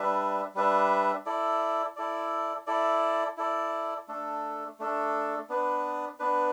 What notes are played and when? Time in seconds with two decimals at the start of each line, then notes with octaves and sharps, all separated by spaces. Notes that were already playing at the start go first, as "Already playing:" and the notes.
Already playing: G3 D4 B4 E5
0.55 G3 D4 B4 E5
1.26 E4 A4 D5
1.96 E4 A4 D5
2.67 E4 A4 D5
3.37 E4 A4 D5
4.08 A3 D4 A4
4.79 A3 D4 A4
5.49 B3 D4 B4
6.20 B3 D4 B4